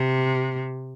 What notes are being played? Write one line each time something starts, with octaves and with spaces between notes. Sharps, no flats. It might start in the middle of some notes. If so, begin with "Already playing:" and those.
Already playing: C3